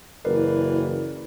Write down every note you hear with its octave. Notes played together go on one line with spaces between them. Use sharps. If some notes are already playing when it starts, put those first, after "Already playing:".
F#1 E3 A#4 B4 D5